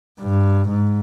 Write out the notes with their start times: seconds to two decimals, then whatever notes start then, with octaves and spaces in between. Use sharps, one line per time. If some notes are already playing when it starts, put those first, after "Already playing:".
0.21 G2
0.68 G#2